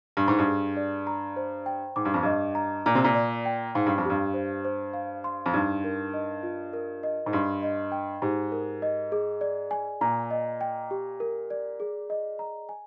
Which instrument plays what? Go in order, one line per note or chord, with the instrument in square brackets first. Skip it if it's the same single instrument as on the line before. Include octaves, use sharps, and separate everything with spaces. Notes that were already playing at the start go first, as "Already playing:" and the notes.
[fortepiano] G2 [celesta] G#5
[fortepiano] G#2
G2
[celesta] G#4
D5
A#5
C5
G5
[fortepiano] G#2 [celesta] D6
[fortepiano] G2
F2
[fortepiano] G2 [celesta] D#5
[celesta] A#5
[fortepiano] A#2 [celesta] A#5
[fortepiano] C3
A#2
[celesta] D5
G5
[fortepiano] G#2 [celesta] F5
[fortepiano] G2
F2
[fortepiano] G2 [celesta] G4
[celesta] C5
C5
F5
C6
[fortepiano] F2
[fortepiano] G2 [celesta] D#4
[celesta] A#4
D#5
F4
A#4
D#5
[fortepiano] G#2
[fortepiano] G2 [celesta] C6
[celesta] D#5
G5
[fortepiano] G#2 [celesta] G4
[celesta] A#4
D#5
G#4
D5
G#5
[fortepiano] A#2 [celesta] A#5
[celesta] D#5
G5
G4
A#4
D5
G#4
D#5
A#5
G#5